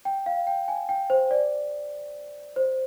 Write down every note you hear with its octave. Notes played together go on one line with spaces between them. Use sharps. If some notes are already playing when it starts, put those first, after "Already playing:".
G5
F5
G5
G#5
G5
C5
D5
C5